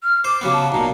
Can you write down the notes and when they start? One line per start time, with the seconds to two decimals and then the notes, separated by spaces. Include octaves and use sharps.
0.03 F6
0.24 C5 D6
0.41 C#3 F#3 B3
0.53 A5
0.72 B1 A#2 A#5